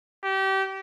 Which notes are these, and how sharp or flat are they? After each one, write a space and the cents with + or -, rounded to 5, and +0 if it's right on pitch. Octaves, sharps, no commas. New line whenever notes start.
G4 -30